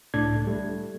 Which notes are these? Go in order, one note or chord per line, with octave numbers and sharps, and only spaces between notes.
C#2 A2 D4 G#6
G3 A3